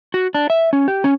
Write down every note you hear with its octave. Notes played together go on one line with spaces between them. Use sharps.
F#4
D4
E5
C#4
G4
C#4